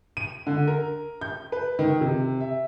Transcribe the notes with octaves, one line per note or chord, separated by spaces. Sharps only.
D#7
D3
A#4
G6
B4
D#3
C3
E5